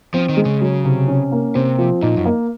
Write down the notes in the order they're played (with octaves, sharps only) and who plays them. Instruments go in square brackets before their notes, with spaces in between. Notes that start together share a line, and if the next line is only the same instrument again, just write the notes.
[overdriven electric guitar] F3 [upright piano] C4
[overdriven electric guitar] D#3
[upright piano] G#3
[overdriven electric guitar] C#3
[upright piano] F#3
C3
C#4
A#3
[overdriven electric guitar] C3 [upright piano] C4
[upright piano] F3
[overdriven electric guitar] A#2 [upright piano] D#4
[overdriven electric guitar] F#2
[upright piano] A#3